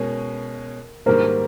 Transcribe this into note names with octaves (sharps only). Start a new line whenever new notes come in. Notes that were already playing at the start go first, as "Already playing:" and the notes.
Already playing: B2 G#3 C#4 A#4
G#2 D#3 G3 A#3 A#4 C5